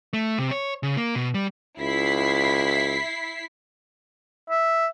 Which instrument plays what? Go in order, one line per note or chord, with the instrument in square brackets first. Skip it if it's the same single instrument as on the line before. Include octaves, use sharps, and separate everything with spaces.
[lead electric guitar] A3
C3
C#5
C#3
A#3
B2
G3
[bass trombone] C#2 [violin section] E4 B6 C7
[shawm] E5